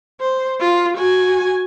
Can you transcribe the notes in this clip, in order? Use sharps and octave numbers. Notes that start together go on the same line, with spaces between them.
C5
F4
F#4 G#5